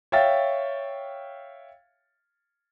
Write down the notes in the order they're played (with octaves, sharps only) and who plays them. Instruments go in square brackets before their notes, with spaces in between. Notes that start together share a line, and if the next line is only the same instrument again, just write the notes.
[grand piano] C#5 E5 F5 G5 A6